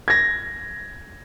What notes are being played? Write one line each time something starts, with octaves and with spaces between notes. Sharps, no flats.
G#6 A#6